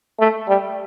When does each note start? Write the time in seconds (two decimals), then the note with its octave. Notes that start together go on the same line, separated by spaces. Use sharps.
0.19 A3
0.48 G3